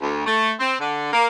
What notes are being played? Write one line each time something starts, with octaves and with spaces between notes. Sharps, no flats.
D2
A3
C4
D3
A#3